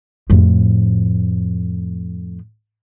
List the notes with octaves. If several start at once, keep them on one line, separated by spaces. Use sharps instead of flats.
F2 A2